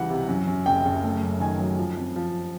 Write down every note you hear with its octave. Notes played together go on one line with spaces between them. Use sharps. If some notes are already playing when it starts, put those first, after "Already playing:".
Already playing: C#2 E3 G3 F#5
C3
F#2
F#2
F#1 G5
F#1
A3
F#2
D#3 G#5
F#3
F3
F2
F3